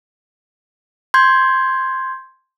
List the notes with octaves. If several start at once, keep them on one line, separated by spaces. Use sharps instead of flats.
C6 G6 G#6